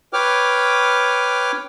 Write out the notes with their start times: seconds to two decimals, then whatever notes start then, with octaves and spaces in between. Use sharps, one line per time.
0.13 B4 C#5 G5 D6 F6